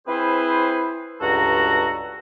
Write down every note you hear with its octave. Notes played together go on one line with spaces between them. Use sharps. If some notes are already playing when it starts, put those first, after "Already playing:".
C4 E4 G#4 B4 C5
C#2 G2 F#4 A4 A#5